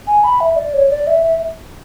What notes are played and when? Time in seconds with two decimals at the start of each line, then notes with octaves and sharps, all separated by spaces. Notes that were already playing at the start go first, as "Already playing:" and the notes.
0.07 G#5
0.24 B5
0.40 E5
0.56 D5
0.74 C#5
0.90 D5
1.07 E5
1.23 E5